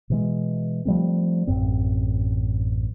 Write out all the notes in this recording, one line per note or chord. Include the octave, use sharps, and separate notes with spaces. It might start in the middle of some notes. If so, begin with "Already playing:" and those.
B2 E3 G#3
F3 G3 A3 C4
A1 F#2 C4